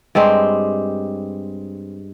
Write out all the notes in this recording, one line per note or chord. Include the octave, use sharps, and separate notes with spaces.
G2 G#3 C4 G4